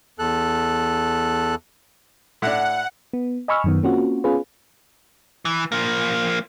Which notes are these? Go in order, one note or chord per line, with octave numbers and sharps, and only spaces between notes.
E2 A4 F#6
A2 D4 F#5
B3
D#5 G#5 B5 C#6 E6 F6
F#2 D#3 B3
A#3 C4 C#4 F4 F#4
B3 C#4 F4 G#4 B4
E3
F3 A#3